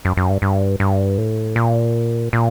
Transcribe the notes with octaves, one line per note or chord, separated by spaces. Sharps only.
F#2
F#2
G2
G2
G2
A2
A#2
A#2